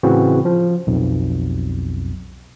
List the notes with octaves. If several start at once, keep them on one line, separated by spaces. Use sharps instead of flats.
A2 C#3 E3 C4 F#4
F3
B1 F2